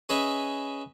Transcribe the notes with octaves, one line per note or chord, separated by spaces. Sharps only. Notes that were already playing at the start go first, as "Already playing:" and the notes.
C#4 G#4 B4 D#5 E5